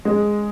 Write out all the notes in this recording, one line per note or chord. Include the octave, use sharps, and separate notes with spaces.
G#3